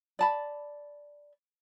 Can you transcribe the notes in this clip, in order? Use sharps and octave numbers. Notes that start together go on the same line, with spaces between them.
D5 A5 B5